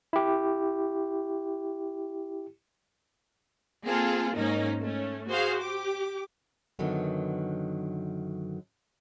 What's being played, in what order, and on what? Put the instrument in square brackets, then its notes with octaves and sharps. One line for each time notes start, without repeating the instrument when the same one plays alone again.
[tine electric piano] E4 G4
[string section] A#3 C4 F4 G#4 A4
G#2 A#3 C#4 D#4
A3 C#4
F#4 G#4 C5 F5
G4 D6
[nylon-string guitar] F#2 D3 D#3 F#3 B3